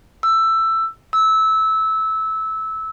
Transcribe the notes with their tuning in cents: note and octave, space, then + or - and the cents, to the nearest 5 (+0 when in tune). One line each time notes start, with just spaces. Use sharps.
E6 +10
E6 -20